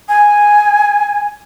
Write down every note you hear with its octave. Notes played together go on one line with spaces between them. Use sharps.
G#5